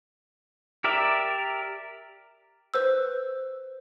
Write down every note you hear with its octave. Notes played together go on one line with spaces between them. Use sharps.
G4 A#4 D5 E5
B4 C5 E6